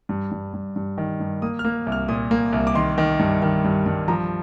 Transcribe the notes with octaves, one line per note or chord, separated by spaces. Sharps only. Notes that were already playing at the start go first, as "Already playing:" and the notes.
G2
G2
G2
G2
D#3
G2
A#3 D#6
F6
A#3
C2
F6
A#2 D#6
A#3
C2
D6
D#3 C6
D#3
G2
D#3
G2
G2
F3 A#5